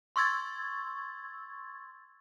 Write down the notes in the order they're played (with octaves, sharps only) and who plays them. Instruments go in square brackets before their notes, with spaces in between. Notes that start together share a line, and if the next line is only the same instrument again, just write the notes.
[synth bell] C6 C#6 E6 G#6 A6